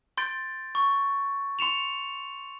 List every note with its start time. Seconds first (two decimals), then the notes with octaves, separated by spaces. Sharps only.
0.17 C6 G6 A6 D7
0.75 C#6
1.59 C6 C#7 E7 F7